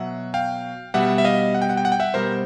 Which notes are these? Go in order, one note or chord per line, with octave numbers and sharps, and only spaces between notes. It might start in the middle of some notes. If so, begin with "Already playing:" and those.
Already playing: B2 F#3 E5 F#5
F5 G5
B2 G3 E5 F#5
E5
D#5 F5
F#5
G5
F#5
G5
F#5
G5
E5 F#5
B2 G3 A#4 C5